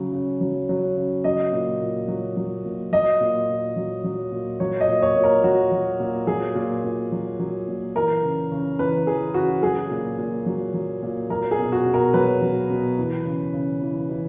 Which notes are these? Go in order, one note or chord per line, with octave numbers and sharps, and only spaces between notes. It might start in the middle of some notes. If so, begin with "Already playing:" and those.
Already playing: C#3 F#3
C#3
F#3
F#3
C#3
F#3 D#5
A#2
A#2
F#3
F#3
A#2
F#3 D#5
A#2
A#2
F#3
F#3
A#2
F#3 C#5
D#5
A#2
C#5
A#2
A#4
F#3 F#4
F#3
A#2
F#3 G#4
A#2
A#2
F#3
F#3
A#2
E3 A#4
C#3
C#3
E3 B4
E3 G#4
C#3 F#4
F#3 G#4
A#2
A#2
F#3
F#3
A#2
F#3 A#4
G#4
B2
F#4
B2
A#4
F#3 B4
F#3
B2
E3
C#3
C#3
E3
E3